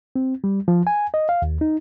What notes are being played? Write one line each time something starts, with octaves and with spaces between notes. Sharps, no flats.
C4
G3
F3
G#5
D#5
F5
D#2
D#4